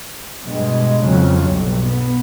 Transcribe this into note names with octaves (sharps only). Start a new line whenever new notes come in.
G2 B2 G#3
F2 C#3 F#3
B1 G2
B3